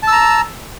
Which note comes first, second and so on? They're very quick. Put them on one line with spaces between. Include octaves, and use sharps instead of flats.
A5 E6 A#5